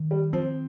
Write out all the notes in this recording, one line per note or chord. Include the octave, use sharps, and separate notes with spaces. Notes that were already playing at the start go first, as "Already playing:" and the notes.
Already playing: D#3
G3
F3 C4